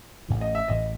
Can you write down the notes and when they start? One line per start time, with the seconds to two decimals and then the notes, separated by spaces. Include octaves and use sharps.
0.28 A1 A2 E3
0.41 D#5
0.55 E5
0.68 A1 A2 E3 D#5